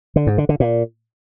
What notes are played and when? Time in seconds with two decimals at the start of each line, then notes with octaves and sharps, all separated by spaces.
0.16 D3
0.27 G#2
0.38 D3
0.49 D3
0.60 A#2